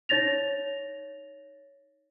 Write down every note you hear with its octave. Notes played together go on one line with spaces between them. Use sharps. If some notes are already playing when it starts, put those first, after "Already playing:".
D#4 C#5 A6 A#6 F7